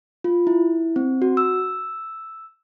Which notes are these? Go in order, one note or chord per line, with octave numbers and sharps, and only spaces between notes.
F4
E4
C4
F#4
E6